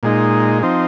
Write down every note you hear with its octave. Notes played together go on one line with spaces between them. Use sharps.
A#2 G#3 D#4
F3 C4 D#4